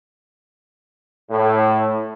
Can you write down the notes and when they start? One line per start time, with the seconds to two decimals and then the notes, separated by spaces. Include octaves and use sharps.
1.30 A2